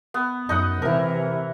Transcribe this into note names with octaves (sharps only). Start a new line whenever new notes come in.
B3
F#2 D#4 D#5 F#5
C3 E3 E4 A#4